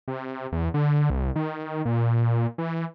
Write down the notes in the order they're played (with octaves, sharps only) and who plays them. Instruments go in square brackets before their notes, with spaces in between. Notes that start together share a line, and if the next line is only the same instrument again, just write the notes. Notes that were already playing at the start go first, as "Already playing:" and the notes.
[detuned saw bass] C3
E2
D3
C2
D#3
A#2
E3